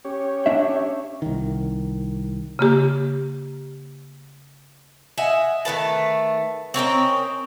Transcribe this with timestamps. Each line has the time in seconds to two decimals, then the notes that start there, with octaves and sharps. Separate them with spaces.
0.05 C#4 G4 C#5
0.46 D4 E5
1.22 C2 D#3
2.59 C#3 A#3 G4
5.18 D#5 E5 F#5 G#5
5.65 D#3 A3 B4 A5
6.74 C4 C#4 A#4 D#5